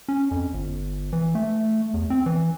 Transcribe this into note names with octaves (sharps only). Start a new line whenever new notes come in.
C#4
F2
G1
E3
A3
E2
C4
E3